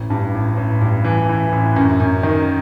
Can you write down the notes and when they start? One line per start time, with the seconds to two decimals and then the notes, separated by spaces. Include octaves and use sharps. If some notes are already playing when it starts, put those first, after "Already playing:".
Already playing: A1
0.10 G2
0.35 A1
0.57 A1
0.81 G2
1.04 E3
1.29 E3
1.52 A1
1.76 F#2
2.00 F#2
2.23 D#3